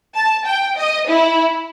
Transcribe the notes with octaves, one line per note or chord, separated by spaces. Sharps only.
A5
G5
D#5
E4